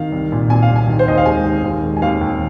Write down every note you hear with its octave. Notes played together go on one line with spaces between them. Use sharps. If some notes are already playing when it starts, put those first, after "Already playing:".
Already playing: D#3 F5
C2
A#2
A#2 G#5
F5
C2
G#5
D#3
C5
D#2 D#5
F5
G#3 G#5
D#3
D#2
G#3
G#5
D#2 F5
D#2